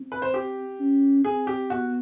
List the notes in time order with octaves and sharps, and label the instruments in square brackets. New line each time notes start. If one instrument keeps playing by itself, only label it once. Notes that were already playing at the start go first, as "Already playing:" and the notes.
Already playing: [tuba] C4
[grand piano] B4
C5
G4
[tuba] C#4
[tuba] C4 [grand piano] G#4
[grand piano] G4
[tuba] B3 [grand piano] F#4